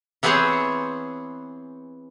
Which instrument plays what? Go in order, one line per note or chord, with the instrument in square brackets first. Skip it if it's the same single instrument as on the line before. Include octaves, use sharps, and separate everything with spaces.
[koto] E3 B3 C4 G#4 C5 C#5